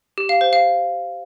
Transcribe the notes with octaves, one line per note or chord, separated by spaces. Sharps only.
G4
F5
C5
F5